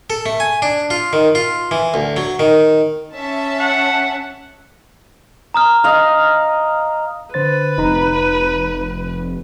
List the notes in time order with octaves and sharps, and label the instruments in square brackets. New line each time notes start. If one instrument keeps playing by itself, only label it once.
[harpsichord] A4
A3
G#5
D4
F4
D#3
F4
E3
D2
F#3
D#3
[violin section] C#4 E5 A5
[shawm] F#5
[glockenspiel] A#5 D#6 F6
[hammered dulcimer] D#5 F5
[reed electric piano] D3 C5 A6 [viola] B4
[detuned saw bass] F1 [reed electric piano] D#4 A#5 B5